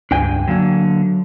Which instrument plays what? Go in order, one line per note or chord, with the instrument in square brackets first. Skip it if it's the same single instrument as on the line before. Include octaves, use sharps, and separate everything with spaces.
[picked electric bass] C#2 G2 [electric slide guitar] D4 G5 G#5
[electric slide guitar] D3 A#3 [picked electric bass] F#3 D4